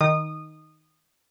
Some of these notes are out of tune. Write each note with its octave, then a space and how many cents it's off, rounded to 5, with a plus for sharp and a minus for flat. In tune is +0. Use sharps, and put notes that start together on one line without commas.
D#3 +0 D#6 -20